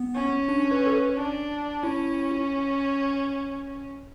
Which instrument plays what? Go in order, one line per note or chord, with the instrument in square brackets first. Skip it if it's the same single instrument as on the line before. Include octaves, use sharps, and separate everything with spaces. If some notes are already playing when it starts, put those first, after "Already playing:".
Already playing: [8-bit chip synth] B3
[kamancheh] C#4
[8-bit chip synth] D4
B4
A4
B4
[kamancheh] D4
[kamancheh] C#4 [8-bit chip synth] E4